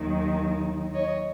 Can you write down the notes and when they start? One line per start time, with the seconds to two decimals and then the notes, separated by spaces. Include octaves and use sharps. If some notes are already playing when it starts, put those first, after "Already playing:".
Already playing: D#2 D#3 F#3
0.93 C#5 D#5